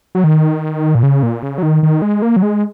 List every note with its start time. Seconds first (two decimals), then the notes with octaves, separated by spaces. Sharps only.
0.15 F#3
0.24 D#3
0.95 A#2
1.03 C#3
1.23 A#2
1.43 C#3
1.58 F#3
1.63 D#3
1.83 D#3
2.02 G#3
2.22 A#3
2.36 F#3
2.42 G#3